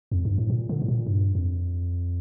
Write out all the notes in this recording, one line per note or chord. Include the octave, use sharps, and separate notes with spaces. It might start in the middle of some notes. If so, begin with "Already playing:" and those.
F2
G2
A2
A#2
D3
A2
A#2
G2
F2